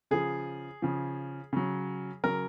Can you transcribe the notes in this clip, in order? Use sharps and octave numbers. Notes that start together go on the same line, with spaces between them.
C#3 F3 G#4
C#3 F3
C#3 F#3
C#3 F#3 A#4